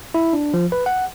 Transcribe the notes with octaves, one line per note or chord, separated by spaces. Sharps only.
E4
D4
F3
B4
F#5